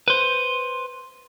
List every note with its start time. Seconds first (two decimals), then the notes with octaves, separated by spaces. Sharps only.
0.08 B4 C5